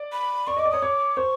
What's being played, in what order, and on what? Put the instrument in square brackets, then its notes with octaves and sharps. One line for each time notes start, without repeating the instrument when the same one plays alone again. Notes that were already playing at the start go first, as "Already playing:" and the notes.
Already playing: [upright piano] D5
[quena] B5
[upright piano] D5 [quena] C#6
[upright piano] D#5 [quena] D6
[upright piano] D5
[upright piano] C#5 [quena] D#6
[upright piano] C#5 [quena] D6
[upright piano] C5 [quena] C#6